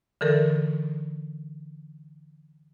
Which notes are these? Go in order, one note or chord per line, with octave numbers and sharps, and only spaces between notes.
D3 E3 A4 A#4